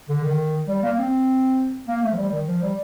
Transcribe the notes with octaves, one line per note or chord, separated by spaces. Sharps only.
D3
D#3
G3
A#3
C4
A#3
A3
F3
G3
D#3
F3
G3